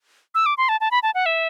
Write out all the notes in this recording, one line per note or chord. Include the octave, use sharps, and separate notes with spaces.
E6
D6
C6
A5
A5
B5
A5
F#5
E5